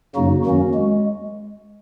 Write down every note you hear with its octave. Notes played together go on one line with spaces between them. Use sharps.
F#2 C#3 F#3 A#3 D#4 F#4
F2 D#3 F#3 A#3 C#4 F#4
G#3